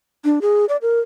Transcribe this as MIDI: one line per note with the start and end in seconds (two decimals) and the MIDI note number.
0.25 0.39 62
0.42 0.65 68
0.69 0.77 74
0.82 1.00 70